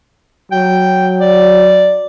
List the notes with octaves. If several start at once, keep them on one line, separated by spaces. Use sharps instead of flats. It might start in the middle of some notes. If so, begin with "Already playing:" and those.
F#3 G5
D5